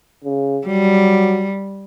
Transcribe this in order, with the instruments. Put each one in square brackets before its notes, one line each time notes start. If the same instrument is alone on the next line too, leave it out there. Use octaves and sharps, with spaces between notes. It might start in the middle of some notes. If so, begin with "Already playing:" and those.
[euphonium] C#3
[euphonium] F#3 [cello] G3